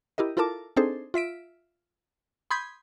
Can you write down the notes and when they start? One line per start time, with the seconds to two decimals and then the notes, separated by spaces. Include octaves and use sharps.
0.18 E4 G4 A#4 D#5
0.37 E4 F4 A4 A#4 A5 D6
0.77 C4 D4 D#4 G#4 A4 C5
1.14 F4 E5 B6 D7
2.51 B5 C6 D#6 G6 G#6 B6